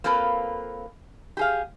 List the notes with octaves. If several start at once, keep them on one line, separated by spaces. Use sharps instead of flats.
A#3 C4 F4 A4 B4
G4 G#4 F5